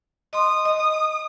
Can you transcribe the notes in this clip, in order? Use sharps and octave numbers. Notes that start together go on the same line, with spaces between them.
D#5 C6 D#6
D#5